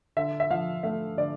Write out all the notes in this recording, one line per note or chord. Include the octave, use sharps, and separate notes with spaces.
D3 E5
E5
F3 F5
A3 E5
D3 D5